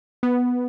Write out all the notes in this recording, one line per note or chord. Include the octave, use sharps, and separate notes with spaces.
B3